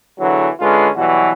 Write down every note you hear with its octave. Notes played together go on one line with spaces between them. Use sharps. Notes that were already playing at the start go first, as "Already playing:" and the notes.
E2 D3 E3 F#3
D3 G#3 C#4 F4 B4
B2 E3 F#3 G3 F#4